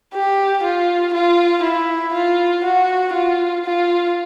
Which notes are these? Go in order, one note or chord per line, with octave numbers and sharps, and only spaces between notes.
G4
F4
F4
E4
F4
F#4
F4
F4